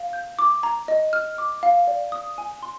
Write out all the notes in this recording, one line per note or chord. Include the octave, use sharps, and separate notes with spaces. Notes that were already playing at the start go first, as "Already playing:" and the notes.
Already playing: F5
G6
D6
A#5
D#5
F6
D6
F5
D5
D#6
G#5
C6